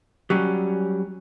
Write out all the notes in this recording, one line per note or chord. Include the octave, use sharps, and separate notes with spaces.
F#3 G3 C#4